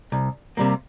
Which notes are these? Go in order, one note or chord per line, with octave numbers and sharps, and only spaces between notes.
C2
C3 G3 A#3